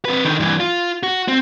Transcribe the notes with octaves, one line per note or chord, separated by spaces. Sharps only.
C4 B4
D3 D#3
G2 E3
F4
F#4
C4